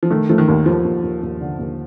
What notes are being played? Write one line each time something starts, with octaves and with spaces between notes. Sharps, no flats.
F3
D#3 A3
F3 A3
D#3
D#2
D#2 F3
D#2
D#2
D#2
D3
D#2